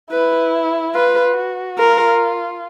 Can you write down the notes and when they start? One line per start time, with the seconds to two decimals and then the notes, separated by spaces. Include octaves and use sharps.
0.11 E4 B4
0.94 F4 B4
1.36 F#4
1.78 F4 A#4